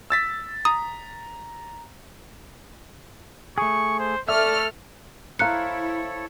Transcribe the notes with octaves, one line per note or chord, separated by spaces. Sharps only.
E6 A6 B6
A#5 D#6
A3 G#4 C#6
C5
A3 A4 D5 E5 F6
E4 A4 C5 C#5 F5 A#5 F#6 C#7